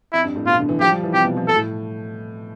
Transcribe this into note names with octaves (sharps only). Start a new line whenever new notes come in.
F2 E4
G2
A2
B2 F4
D3
E3
F3 G4
G3
E3
C3 G4
B2
F3
A4
A2